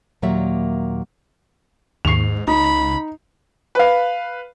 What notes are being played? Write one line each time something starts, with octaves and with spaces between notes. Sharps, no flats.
D#2 A#2 F#3 A#3 D5 E5
D#2 G#2 C#6 C7 F7
C#2 D#4 B5
B4 F5